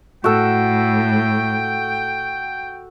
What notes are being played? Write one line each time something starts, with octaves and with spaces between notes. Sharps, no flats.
A2 F#4 A4 G5